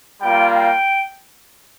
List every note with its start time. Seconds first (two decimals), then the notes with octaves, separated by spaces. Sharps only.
0.21 G3 A#3 F4 G5
0.55 G5